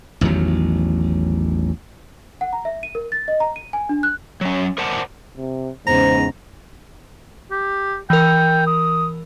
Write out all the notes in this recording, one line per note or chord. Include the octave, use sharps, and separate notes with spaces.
A1 E2 D#3 F#3
F#5
A#5
E5
D#7
A#4
A6
D#5
A#5
D#7
G#5
D4
F#6
F#3 C#4
A#4 C5 D5 F#5 A5
C3
E2 G#2 C#3 C5 A#5
G4
E3 A#4 G5
D#6